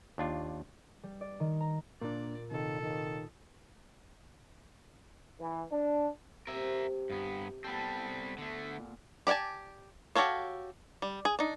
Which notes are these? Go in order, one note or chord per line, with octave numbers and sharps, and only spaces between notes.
D#2 D4 F4
G3
D5
D#3
A#5
A#2 A#3 D4 D5
C3 D#3 A4
D#3 D#5
E3
D4
C3 A#4 E5
G2 B3
G3 B3 C4 A4
D3 A3
A#2
G4 D5 F#5 G#5 A5
F#4 G4 A4 C#5 F5
G3
G#4
D4 D#4